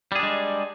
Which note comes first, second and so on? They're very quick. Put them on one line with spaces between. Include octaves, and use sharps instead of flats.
G3 G#4 D4 G#3